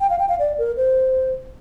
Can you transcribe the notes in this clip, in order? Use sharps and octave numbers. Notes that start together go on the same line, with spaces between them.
G5
F5
G5
F5
D5
A#4
C5